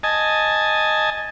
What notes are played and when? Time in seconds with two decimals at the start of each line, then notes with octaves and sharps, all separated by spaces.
0.03 D#5 G#5 A5